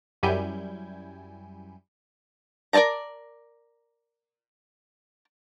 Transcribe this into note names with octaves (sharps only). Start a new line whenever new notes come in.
F#2 G3 E4 G#5 G6
A#4 D5 D#5 A5 A#5